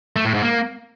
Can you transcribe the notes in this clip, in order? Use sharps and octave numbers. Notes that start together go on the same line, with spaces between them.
A3
A2
G#2
A#3